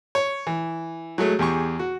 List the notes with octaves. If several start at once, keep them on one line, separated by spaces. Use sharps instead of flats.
C#5
E3
F#3 G#3 A3
E2 G4 G#4 C#6
F#4